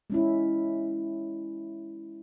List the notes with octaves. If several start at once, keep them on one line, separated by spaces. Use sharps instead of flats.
G#3 C#4 E4